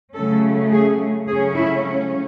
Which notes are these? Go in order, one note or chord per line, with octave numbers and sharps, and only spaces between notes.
C#3 F#3 A3 C#4 A4
G#4
C#3 F#3 A3 C#4 G#4
E4